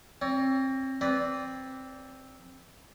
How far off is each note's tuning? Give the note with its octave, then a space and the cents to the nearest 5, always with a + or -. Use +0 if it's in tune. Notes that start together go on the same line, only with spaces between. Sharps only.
C4 +25 C#5 +40
C4 +5 B4 +0 D5 -20